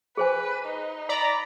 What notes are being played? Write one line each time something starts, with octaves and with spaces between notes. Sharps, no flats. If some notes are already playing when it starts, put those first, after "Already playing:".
G#4 B4 C5 G#5
D#4
D5 A#5 B5